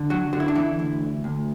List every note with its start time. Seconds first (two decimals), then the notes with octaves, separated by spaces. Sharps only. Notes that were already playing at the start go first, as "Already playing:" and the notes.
Already playing: D3
0.10 F#3 F#4
0.33 D3 F#4
0.40 E4
0.48 D4
0.55 E3 E4
0.79 D2
1.24 D2